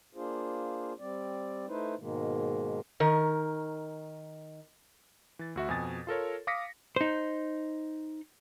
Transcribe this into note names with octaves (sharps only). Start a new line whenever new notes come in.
A#3 D4 F4 G#4 C5
G3 C4 D5
A3 D#4 E4 B4 C5
G#2 B2 D#3 G#3 A#3
D#3 A#4
E3 A6
D2 F#4 E5
F2 B2 G#5 D#6 A6
F4 A4 A#4 C#5
F5 D6 D#6 A#6 B6 C#7
D#4 C5